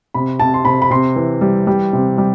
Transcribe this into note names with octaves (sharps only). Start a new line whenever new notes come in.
C3 B5
C3 A5
C6
C3 B5
B5
C3 C6
E3
G3
G3
C3
G3